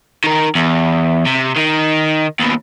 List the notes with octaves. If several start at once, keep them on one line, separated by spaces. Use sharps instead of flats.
D#3 A#4
E2
C3
D#3 D#4
D#2 B2